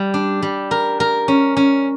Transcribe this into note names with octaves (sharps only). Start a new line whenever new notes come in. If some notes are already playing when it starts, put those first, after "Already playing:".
Already playing: G3
D4
G3
A#4
A#4
C#4
C#4